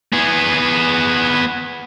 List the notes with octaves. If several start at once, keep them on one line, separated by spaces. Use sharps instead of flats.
B3 G#4